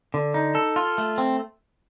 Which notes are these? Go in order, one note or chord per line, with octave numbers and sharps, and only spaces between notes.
D3
D#4
A4
F4
A3
C4